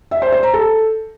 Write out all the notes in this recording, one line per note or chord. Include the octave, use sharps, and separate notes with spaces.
E5
C5
C5
A#5
A4